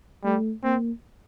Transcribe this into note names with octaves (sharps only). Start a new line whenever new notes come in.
G3 A3
A#3 C4